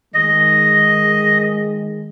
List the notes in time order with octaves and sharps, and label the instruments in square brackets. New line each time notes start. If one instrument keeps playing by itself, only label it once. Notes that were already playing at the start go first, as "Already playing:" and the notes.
[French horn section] D#3 G#3 [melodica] D#5